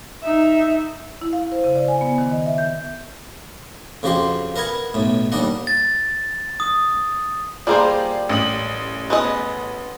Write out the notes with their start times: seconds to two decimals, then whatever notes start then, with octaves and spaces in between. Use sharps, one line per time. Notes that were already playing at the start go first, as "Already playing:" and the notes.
0.23 D#4 E5
1.21 E4
1.33 F5
1.52 C5
1.64 C#3
1.76 D5
1.88 G#5
2.01 B3
2.18 D#3
2.32 D#5
2.46 E5
2.58 G6
4.03 F2 C#3 F#4 G4 C6
4.56 A#4 B4 D#5 F#5 G#5
4.94 B1 A2
5.32 D#2 G3 D4 D#5 F#5
5.67 A6
6.60 D#6
7.67 G3 A#3 F4 G#4 C5 D5
8.29 A1 D#6 F#7
9.10 B3 G#4 D#5